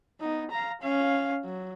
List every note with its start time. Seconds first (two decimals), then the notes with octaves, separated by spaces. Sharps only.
0.20 B3 D#4
0.51 F5 A#5
0.82 C#4 F5
1.45 F#3